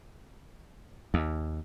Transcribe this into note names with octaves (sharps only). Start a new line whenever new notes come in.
D#2